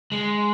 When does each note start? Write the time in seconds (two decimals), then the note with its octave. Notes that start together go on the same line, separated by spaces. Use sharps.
0.12 G#3